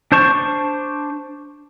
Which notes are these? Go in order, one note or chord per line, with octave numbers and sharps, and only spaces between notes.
D4 C5 A5 C#6